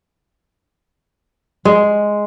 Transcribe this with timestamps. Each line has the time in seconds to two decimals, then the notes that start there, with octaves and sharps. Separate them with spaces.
1.65 G#3